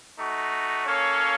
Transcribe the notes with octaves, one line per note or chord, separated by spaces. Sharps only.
A3 D#4 F#4
A#3 C#4 A4 C#5 F5